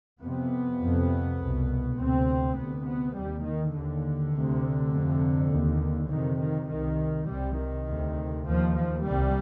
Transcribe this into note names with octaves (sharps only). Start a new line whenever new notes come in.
F2 C3 B3
F2 C3
C2 B2
D2 C3 C4
D2 C3 B3
B3
D#2 G3
D#3
D#2 D3
D2 C3
F2 C3
D#2
F2 C3 D#3
D#3
C2 C3 D#3
C2 C3 G3
D#3
D2 C3
D#2 F3
F3
C2 C3 G3